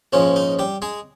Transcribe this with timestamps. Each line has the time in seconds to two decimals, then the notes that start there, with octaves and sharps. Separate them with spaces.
0.13 A#1 G#2 F3 G#3 C#4
0.36 D#4
0.59 G3 G4
0.82 G#3 G#4